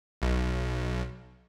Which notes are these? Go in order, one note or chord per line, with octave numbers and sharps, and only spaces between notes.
B1